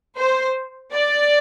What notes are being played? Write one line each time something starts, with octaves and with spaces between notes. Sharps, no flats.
C5
D5